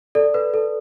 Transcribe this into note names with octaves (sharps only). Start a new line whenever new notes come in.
A4 D5
B4
A4